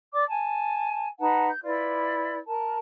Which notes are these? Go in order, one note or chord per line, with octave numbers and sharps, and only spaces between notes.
D5 D6
G#5 A5
D#4 B4 F#5 A5
G6
E4 F4 B4 D5
A#4 A5